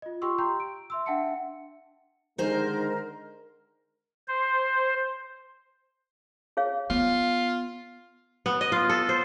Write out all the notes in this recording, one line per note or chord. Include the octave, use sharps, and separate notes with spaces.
F4 D#5
F4 G4 G5 C6 C#6 E6
G5 A#5 C6 G6
D7
E5 C6 E6
D4 E5 F#5 G5 A5 C#7
D3 D#3 G#3 D#4 G#4 A#4 C5
C5
G#4 C#5 F5
B3 F4
B3
D#5
F4
A4
C5